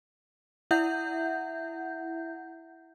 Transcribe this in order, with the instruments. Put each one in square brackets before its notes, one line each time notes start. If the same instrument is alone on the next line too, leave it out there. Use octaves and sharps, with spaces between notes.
[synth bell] E4 E5 F#5 G6